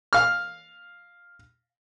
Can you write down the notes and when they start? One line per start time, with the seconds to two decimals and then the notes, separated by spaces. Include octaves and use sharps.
0.13 F5 F6